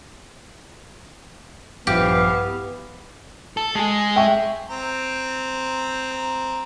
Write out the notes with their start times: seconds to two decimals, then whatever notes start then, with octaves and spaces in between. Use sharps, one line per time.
1.87 A#1 G2 E3 F3 B3 G4 F5
3.57 A4
3.75 G#3 G#4
4.16 E5 G5 C#6
4.69 C4 A#5